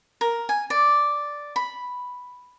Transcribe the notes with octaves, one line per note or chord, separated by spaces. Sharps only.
A#4
G#5
D5
B5